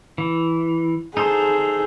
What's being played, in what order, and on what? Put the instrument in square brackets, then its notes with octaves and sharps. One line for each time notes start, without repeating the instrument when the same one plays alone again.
[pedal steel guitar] E3
[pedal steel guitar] D#4 A4 C5 [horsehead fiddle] G#4